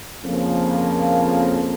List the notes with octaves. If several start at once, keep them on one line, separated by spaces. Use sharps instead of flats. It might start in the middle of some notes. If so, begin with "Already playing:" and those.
F2 C#3 F3 A#3